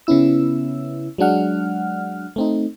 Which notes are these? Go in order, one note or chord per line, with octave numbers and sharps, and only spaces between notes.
C#3 B3 C#4 E4 E6
F#3 G#3 D4 F#5 F6
A3 C4 D#4